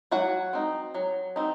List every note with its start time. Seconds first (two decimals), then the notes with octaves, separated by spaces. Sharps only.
0.12 F#3 F#4 F#5
0.53 C4 D#4
0.95 F#3
1.36 C4 D#4